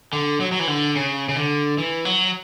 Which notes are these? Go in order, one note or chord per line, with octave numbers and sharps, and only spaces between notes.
D3
F#3
F#3
E3
D3
C#3
C#3
D3
E3
F#3